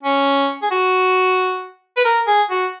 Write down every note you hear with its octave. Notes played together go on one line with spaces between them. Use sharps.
C#4
G#4
F#4
B4
A#4
G#4
F#4